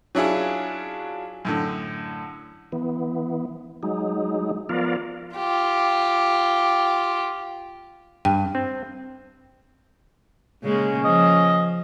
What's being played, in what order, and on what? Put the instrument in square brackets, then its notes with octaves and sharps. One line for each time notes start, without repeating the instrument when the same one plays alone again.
[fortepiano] F#3 C#4 D4 E4 F4 G#4
F#2 A2 D3
[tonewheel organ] E3 B3
F#3 G#3 D#4
F3 B3 F4 A#4 D5 F5
[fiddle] F4 G4
[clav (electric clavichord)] G2 [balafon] G5
[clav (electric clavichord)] C4
[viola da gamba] C#3 G#3 A#3 [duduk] C#4
[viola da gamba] F3 [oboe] D#5